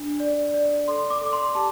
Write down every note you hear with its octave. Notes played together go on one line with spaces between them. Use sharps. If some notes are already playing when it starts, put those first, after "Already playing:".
Already playing: D4
D5
D5
A4 C6
D6
A4 D6
C6
G4 A5